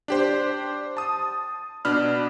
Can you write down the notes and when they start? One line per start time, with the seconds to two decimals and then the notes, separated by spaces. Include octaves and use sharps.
0.08 D4 G4 C5
0.97 A5 D#6
1.85 B2 D4 B5 F6